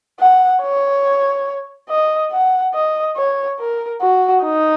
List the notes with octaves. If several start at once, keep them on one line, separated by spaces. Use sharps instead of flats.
F#5
C#5
D#5
F#5
D#5
C#5
A#4
F#4
D#4